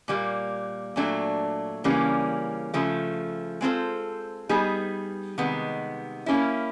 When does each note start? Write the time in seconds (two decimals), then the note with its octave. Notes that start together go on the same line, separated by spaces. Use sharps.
0.08 A#2 G3 A#3
0.96 A#2 F#3 A3 D4
1.84 C#3 E3 G3 A#3 C#4
2.74 C#3 F3 A3
3.61 G#3 C4 F4 A4 C5
4.49 G3 B3 D#4 G#4
5.38 C3 D#3 G#3 B3
6.26 A#3 C#4 E4